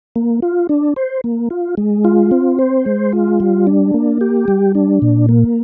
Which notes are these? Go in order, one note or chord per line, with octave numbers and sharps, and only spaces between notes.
A#3
F4
D4
C5
A#3
F4
G#3
F4
C4
C5
G#3
F4
G3
D4
A#3
G4
G3
D4
A#2
A#3